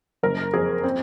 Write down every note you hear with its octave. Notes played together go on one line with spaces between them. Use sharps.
F#1 A#4
F2 G#4
C4